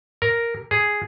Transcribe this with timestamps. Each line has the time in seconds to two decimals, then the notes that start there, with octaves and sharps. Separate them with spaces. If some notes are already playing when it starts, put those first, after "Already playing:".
0.22 A#4
0.71 G#4